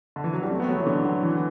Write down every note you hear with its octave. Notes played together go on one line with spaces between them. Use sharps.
D3
E3
F#3
G3
A3 C4
B3
F#3 A3
E3
D3
F#3
E3